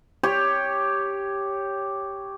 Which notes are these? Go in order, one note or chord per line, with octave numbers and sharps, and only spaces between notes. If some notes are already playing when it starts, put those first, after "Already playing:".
G4 C#5